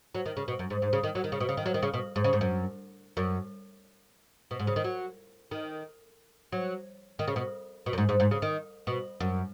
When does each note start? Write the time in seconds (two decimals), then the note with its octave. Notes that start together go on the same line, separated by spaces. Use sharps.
0.15 F#3
0.26 D#3
0.37 C#3
0.48 B2
0.59 F#2
0.70 G#2
0.82 G#2
0.93 C#3
1.04 D#3
1.15 F#3
1.24 D#3
1.32 C#3
1.40 B2
1.49 C#3
1.57 D#3
1.66 F#3
1.74 D#3
1.83 C#3
1.94 B2
2.16 G#2
2.24 C#3
2.33 G#2
2.41 F#2
3.17 F#2
4.51 B2
4.59 G#2
4.67 C#3
4.76 D#3
4.84 F#3
5.51 D#3
6.52 F#3
7.19 D#3
7.28 C#3
7.36 B2
7.86 B2
7.93 F#2
7.98 G#2
8.09 G#2
8.20 G#2
8.31 C#3
8.42 D#3
8.87 B2
9.20 F#2